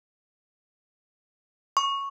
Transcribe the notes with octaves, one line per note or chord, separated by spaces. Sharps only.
C#6